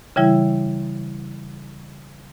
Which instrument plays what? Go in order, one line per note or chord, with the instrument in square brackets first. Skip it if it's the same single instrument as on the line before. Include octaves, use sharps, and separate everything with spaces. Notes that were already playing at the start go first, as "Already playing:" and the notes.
[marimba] C#3 E3 G3 E4